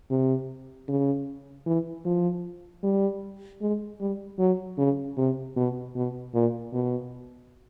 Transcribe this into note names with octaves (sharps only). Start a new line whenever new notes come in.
C3
C#3
E3
F3
G3
G#3
G3
F#3
C#3
C3
B2
B2
A#2
B2